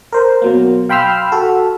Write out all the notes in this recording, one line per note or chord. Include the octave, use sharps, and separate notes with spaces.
A#4 C5
B2 F#3 A#3
F5 G5 B5 C6 E6 F6
F#4 A4